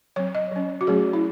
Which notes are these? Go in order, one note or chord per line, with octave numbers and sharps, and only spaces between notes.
F#3 C4 C#5
D#5
F#3 C#4
F#4
F#3 A3 C#4 G#4
E4